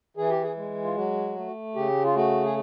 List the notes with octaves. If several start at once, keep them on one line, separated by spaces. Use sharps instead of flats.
E3 G#4
G4
G#4
G#3
F4
F#3 F#4
A3
C#3 G4
F4
A3 F#4
G#4